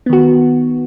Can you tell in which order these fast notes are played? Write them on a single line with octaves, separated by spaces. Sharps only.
B3 D#3 F#4